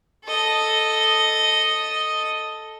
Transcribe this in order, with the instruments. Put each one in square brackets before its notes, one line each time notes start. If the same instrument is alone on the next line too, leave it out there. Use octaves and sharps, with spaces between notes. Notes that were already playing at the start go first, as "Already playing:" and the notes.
[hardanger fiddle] A4 D#5